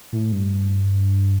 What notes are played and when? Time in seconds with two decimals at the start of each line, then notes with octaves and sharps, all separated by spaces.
0.12 A2
0.32 G2